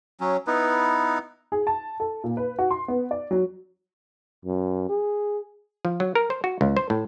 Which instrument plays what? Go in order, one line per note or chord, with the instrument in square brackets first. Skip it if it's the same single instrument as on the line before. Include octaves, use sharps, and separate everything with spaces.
[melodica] F#3 C#4
B3 D#4 E4 B4
[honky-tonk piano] G#4
A5
A4
A#2
B4
F#4
C6
B3
D5
F#3
[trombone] F#2
G#4
[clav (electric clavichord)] F3
F#3
A#4
C5
F#4
C#2
C5
A2